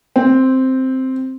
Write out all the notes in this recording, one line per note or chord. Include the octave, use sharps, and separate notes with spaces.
C4